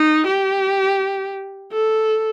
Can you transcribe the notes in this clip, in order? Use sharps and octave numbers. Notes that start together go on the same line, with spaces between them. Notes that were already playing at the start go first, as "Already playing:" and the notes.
Already playing: D#4
G4
A4